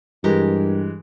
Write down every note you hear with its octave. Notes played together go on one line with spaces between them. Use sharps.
G2 E3 G#3 G4 A#4